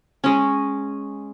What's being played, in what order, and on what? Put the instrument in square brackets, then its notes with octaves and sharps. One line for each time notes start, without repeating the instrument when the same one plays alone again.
[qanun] G#3 C#4